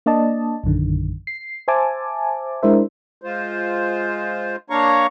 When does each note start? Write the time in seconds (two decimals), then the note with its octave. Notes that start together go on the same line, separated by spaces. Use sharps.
0.06 A#3 D4 D5 D#5 A5
0.64 A#1 F#2 D3 D#3
1.27 C7
1.68 C5 E5 G#5 A5 D6
2.62 G#3 D4 E4 A#4 C5 E5
3.22 G#3 F4 C5
4.70 A#3 D4 C#5 F5 A#5 C#6